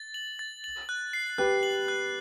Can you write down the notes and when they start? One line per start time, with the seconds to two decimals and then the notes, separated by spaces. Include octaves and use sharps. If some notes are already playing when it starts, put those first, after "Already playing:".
Already playing: A6
0.14 F#7
0.39 A6
0.64 F#7
0.89 F#6
1.13 C7
1.38 G4 B4 F#6
1.63 F#7
1.88 F#6